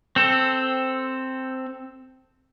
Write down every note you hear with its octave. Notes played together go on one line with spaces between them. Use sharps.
C4 A4